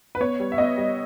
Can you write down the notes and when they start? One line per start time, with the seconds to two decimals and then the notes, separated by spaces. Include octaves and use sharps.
0.15 B4
0.20 B3 C#5
0.40 G3
0.52 E5
0.58 B3 D#5
0.77 G3